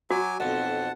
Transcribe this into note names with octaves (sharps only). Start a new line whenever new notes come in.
F#3 F#4 G#5 D6
B1 F2 F#5 A5